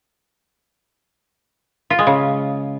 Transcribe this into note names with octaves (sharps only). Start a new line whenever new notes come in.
F4
G#3
C#3